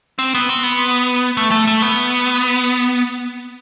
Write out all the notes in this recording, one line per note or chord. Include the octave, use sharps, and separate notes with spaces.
C4
B3
C4
B3
A3
A3
A3
B3